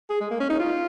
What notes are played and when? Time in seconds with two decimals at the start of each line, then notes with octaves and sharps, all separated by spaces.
0.10 G#4
0.21 G#3
0.31 A#3
0.40 C#4
0.50 D#4
0.60 F4